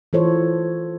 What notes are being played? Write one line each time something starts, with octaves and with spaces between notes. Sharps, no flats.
E3 F4 A4 C5 C#5